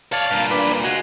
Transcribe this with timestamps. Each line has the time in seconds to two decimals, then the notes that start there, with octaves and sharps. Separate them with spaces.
0.13 C#5 D5 F5 A5
0.31 G2 A#2
0.51 D4 B4
0.84 G#3 F4 F#4